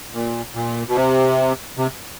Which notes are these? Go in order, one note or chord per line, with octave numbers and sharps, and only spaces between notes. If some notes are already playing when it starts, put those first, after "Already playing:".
A#2
A#2
B2
C3
C3